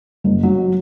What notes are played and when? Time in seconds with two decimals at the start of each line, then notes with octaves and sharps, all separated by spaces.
0.24 F#1
0.43 F#3